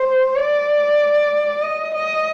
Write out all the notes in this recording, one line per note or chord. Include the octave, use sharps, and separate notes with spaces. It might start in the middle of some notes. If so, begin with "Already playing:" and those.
Already playing: C5
D5
D#5
D#5